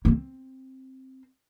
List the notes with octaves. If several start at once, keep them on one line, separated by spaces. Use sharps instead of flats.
A#3
C4